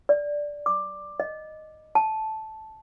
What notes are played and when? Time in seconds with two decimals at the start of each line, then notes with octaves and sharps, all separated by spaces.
0.09 D5
0.66 D6
1.20 D#5
1.95 A5